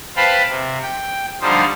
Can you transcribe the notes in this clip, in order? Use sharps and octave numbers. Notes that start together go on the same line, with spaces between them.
B4 C5 F5 G5 A5 B5
C3
G5
D3 F3 G3 D#4 F4 C5